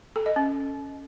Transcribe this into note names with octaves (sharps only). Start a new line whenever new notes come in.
A4
D#5
C#4